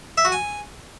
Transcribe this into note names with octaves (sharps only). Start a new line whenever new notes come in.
E5
F#4
G#5